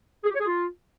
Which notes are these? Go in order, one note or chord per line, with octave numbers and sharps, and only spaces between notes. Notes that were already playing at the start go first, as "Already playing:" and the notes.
G#4
G4
C#5
G#4
F4